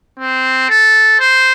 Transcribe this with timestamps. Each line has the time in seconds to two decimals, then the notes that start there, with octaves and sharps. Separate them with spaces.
0.20 C4
0.70 A4
1.20 C5